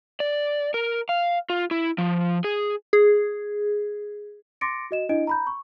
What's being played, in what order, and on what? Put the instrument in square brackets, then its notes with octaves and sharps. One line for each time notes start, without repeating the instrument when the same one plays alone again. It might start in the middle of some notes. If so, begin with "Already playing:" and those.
[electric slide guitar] D5
A#4
F5
F4
E4
F3
G#4
[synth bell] G#4
[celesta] C6 D6 A6 A#6 C#7 D7
F#4 D#5 E7
D4 E4 D#5 D7
A#5 B5 G6
C#6